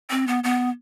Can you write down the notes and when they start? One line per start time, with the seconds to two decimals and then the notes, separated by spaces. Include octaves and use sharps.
0.10 C4
0.27 B3
0.44 B3